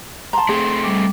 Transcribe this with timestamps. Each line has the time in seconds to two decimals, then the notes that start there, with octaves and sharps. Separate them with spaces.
0.33 A5 A#5 C6
0.49 A3 C4 G#4
0.83 G3 D6